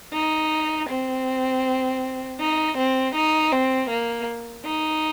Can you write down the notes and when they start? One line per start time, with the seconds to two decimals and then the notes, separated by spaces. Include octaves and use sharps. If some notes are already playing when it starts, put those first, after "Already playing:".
0.13 D#4
0.90 C4
2.40 D#4
2.78 C4
3.15 D#4
3.52 C4
3.90 A#3
4.65 D#4